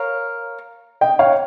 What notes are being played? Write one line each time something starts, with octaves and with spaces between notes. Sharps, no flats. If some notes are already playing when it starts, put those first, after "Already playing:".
Already playing: A#4 C#5 F5
D#5 G5
C#5 F5